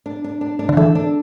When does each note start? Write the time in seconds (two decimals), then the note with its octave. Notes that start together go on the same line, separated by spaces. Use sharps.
0.06 D4
0.24 D4
0.41 D4
0.59 D4
0.69 D3
0.77 E3 A4
0.95 D4